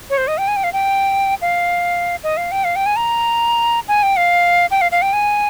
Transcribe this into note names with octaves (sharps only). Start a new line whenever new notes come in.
C#5
C5
D#5
G5
G#5
G5
F5
G5
F5
D#5
F5
G5
F5
G5
G#5
A#5
G#5
G5
F5
G5
F5
F5
G5
G#5